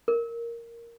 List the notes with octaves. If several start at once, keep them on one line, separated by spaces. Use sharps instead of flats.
A#4